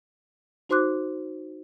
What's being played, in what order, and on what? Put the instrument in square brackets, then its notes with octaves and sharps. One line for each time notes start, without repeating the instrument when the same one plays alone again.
[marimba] D#4 F#4 C5 C6 D6 F#6